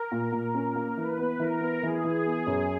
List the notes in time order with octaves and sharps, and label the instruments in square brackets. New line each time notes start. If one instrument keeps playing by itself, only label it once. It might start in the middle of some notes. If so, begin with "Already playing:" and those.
Already playing: [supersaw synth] A#4
[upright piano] A#2
A#2
C#4
A#3
[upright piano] E3 [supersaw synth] B4
[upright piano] B3
[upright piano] E3 [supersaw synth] A#4
[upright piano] B3
[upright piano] E3 [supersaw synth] G#4
[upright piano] E3
B3
F#2